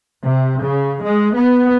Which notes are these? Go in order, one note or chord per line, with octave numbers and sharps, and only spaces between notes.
C3
C#3
G#3
B3